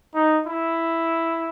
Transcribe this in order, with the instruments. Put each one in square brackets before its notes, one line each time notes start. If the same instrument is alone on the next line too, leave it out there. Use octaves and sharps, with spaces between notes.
[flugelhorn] D#4
E4